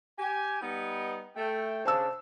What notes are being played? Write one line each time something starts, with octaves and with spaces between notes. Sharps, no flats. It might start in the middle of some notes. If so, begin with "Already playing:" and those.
G4 G#5
G3 B3 D#4
A3 G5
C#3 D4 C5 A5 E6